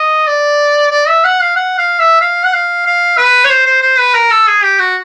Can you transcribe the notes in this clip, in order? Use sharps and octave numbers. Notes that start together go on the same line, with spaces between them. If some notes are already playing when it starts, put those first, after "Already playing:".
Already playing: D#5
D5
D5
E5
F#5
F5
F#5
F5
E5
F5
F#5
F5
F5
B4
C#5
C5
C5
C5
B4
A#4
A4
G#4
G4
F#4